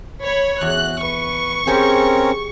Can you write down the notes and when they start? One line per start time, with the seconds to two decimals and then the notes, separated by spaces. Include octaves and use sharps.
0.23 C#5 B5
0.61 E2 F#4 F#6
1.02 B4 C#6
1.67 C4 C#4 G4 G#4 A#4 C5